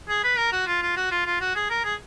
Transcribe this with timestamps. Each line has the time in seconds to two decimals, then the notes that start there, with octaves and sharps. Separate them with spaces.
0.09 G#4
0.24 B4
0.37 A#4
0.52 F#4
0.67 F4
0.82 F4
0.97 F#4
1.11 F4
1.26 F4
1.41 F#4
1.55 G#4
1.70 A#4
1.84 G#4